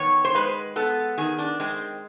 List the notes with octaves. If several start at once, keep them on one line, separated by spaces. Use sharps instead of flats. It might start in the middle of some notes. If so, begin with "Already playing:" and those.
Already playing: D#3 B3 C#5
C5
G#3 B4
B3 A4
D#3 G#4
D4
G#3 C4